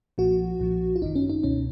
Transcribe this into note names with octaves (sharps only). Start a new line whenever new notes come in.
B1 A#2 F3 F#4
B1 A#2 F3
F4
G#1 F#2 D#3 D#4
C#4
D#4
C#2 B2 C#4